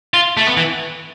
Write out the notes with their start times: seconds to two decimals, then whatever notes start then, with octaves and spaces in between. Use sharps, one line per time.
0.14 F4
0.37 A3
0.47 B3
0.57 E3